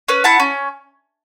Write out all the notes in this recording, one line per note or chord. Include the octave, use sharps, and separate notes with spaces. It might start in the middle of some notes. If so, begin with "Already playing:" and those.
C#4 B4
E4 F#5 A5
C#4